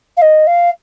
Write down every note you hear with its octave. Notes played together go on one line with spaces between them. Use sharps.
F5
D#5
F5